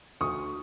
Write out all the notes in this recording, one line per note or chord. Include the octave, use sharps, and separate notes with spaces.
D2 C#6 D#6